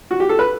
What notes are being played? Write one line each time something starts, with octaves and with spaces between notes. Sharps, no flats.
F#4
G4
A4
B4